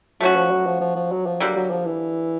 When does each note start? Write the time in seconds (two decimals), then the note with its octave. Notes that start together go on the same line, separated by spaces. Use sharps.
0.20 F#3 A3 C#4 F#4
0.35 F3
0.51 F#3
0.66 F3
0.81 F3
0.96 F3
1.12 F#3
1.26 F3
1.40 D3 F#3 G3 A#3
1.56 F#3
1.70 F3
1.86 E3